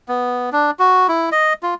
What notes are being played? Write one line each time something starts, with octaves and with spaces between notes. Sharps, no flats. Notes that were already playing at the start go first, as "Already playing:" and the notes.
B3
D4
F#4
E4
D#5
F4